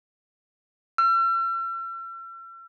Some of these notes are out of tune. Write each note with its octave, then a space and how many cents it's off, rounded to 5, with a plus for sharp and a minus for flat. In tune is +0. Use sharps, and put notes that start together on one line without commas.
E6 +45